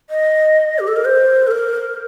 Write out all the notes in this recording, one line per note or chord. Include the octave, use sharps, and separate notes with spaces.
D#5
G4
A4
A#4
C5
A4
A#4